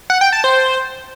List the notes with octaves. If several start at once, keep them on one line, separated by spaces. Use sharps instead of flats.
F#5
G5
A5
C5